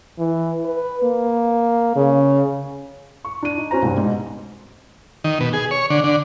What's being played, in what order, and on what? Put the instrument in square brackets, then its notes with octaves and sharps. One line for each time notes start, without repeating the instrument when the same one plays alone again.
[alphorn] E3
B4
A#3
C#3
[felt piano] C#6
D4 D#7
D#4
C#4 F#4 C5 A#5
C2 G2 C5
G#2 B2
[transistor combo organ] D#3
B2
G#4
C#5
D3
D3